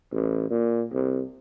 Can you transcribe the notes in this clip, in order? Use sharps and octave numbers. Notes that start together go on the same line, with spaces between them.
A1
A#2
C2